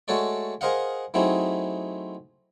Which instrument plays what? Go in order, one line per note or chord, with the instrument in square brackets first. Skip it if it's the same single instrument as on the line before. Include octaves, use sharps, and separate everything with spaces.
[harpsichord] G#3 A3 F#4 A4 C#5 D5
G#4 A#4 C5 D#5 F5 F#5
F#3 A3 C4 D#4 E4 G#4